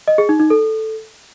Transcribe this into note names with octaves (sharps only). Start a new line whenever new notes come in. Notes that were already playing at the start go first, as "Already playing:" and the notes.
D#5
G#4
D#4
D#4
A4